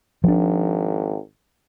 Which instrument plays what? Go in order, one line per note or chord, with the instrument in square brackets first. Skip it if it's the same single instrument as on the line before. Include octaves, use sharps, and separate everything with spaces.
[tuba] G#1 [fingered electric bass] F3 D4